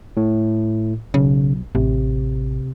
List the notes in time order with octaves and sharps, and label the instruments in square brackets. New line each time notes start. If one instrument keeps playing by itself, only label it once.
[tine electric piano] A2
[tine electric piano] B1 [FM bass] C#3
[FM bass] A1 [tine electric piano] C3